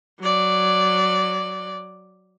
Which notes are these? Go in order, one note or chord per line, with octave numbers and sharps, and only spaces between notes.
F#3 D5